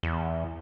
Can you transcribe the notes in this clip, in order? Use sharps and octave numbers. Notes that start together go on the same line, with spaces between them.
E2